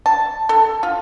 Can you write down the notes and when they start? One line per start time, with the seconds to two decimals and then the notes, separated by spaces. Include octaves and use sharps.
0.06 A5
0.49 A4
0.83 F4